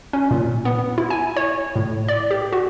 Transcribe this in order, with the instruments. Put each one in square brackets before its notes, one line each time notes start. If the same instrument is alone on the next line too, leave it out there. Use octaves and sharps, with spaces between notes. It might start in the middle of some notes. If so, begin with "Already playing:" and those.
[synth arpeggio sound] C#4
A#2
B3
E4
G#5
C#5
A2
D5
G4
F#4